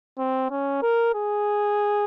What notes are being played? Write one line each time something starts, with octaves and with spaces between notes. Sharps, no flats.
C4
C#4
A#4
G#4